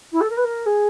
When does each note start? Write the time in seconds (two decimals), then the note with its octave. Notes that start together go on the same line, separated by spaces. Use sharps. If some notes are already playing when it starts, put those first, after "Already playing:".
0.12 E4
0.20 A4
0.29 A#4
0.37 B4
0.44 A#4
0.66 G#4